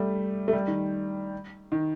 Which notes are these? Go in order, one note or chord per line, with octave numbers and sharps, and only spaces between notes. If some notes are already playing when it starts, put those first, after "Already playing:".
Already playing: G3 A3
A3
G3
D#3
D#3